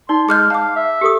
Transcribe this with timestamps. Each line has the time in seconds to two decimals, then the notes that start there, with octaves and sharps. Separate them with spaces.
0.09 D#4 D5 C6
0.29 G#3 G#4 D#5 D6 F6 G6
0.50 F5 A5 D6
0.76 E5
1.01 G4 A4 D#6